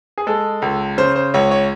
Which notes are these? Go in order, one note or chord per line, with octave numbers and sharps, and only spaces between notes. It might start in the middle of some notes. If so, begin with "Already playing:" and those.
G#4
G#3 A4
C#2
C#3 C5
C5
C#2 C#5
C#5